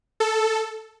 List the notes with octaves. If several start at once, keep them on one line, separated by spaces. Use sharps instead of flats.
A4